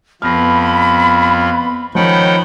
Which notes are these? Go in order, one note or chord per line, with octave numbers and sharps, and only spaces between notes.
F2 F3 B3 B5 F6 A#6
D#3 F3 C#4 C#5 F#5 G5 B5